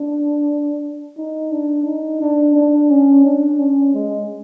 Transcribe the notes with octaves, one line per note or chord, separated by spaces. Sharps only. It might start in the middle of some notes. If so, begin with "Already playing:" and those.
Already playing: D4
D#4
D4
D#4
D4
D4
C#4
D4
C#4
G#3